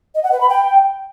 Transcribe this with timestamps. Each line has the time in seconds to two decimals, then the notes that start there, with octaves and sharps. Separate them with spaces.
0.15 D#5
0.23 F#5
0.32 B4
0.41 B5
0.49 G5